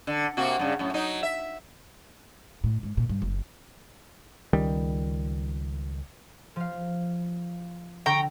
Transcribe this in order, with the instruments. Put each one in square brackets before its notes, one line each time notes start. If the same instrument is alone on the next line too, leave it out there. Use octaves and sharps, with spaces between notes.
[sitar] D3
C3 A#3 F#4
G2 C#3
F#2 A2
F#3 D#4
E5
[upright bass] A2
G#2
A#2
G2
F#1
[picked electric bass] C#2 D#3 G3
[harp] F3 F5
[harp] D3 [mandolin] G5 A#5 C#6